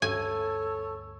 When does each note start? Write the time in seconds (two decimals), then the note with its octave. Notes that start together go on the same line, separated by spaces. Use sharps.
0.02 D2 G2 C#4 A4 C#5 G#5